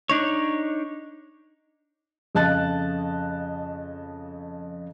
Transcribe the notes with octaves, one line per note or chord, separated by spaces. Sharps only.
D4 D#4 C#5
F2 C#3 D#5 A5 F#6 A6